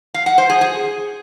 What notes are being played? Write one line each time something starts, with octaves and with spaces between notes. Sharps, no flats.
F5
F#5
C5
G#4
G#4